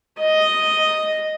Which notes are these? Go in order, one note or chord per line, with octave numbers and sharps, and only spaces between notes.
D#5